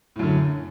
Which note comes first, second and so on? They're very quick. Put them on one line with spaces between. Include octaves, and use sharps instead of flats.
A2 F#2 D3